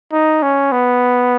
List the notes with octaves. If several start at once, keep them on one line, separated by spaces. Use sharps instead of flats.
D#4
C#4
B3